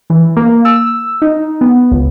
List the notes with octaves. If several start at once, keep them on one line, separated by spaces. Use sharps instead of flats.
E3
A#3
E6
D#4
B3
C#2